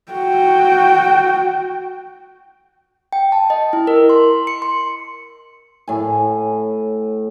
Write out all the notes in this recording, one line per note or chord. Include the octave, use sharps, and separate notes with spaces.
F#4 G5
G5
A5
D#5
E4
A#4
C6
C#7
C6
A2 G#5